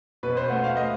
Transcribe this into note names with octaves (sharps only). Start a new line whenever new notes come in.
B2 B4
C5
A3 F#5
F5
D#5